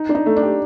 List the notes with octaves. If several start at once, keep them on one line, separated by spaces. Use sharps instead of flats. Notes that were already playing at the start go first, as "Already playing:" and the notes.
Already playing: D#4
D4
D#4
A3
D4
G4